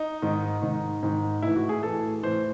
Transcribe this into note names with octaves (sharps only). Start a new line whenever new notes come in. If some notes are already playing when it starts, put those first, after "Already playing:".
Already playing: D#4
G#2 D#3
G#2 D#3
G#2 D#3
A2 E3 E4
F#4
G#4
A2 E3 A4
A2 E3 C5